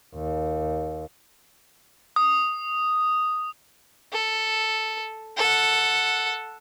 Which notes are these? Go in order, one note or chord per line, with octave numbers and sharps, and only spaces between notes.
D#2
D#6
A4
A4 F#5